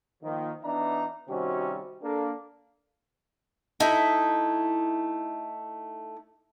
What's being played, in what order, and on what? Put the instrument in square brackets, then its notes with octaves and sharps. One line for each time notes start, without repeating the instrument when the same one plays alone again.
[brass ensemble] D#3 F3 A#3
E3 B3 D4 D#4 E5 A#5
C3 D#3 G3 C#4 F#4 C5
A#3 D4 A4
[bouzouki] A3 D#4 E4